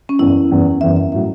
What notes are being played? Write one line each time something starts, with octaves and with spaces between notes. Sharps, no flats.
C#4
F#1 E2 E3 E4
F#1 E2 E3
F#1 E2 E3 E5
E5
A2 F#3 E5